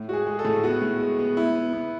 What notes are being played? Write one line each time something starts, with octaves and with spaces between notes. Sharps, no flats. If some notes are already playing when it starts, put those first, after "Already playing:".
Already playing: A2
G#3 F#4 G#4
G#3
A4
A2
B3 F#4
A2
G#3
B3
B3 E4
B3
B3